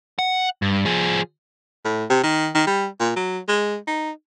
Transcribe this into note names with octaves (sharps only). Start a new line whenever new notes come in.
F#5
G2
F3 G#4
A2
C3
D#3
D#3
G3
A#2
F#3
G#3
D#4